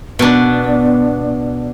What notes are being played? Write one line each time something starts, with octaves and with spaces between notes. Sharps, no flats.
B2 B3 D4